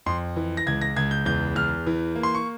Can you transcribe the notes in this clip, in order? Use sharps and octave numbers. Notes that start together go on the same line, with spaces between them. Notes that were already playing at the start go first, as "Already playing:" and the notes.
F2 C6
E3
A#6
C#2 G#6
A#6
C#2 G#6
G6
E2 G6
E2 F6
E3
A#3
C6
C#6